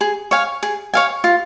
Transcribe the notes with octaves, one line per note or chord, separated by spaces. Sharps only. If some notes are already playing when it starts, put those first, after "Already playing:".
G#4
C#5 F5 G#5
G#4
C#5 F5 G#5
F4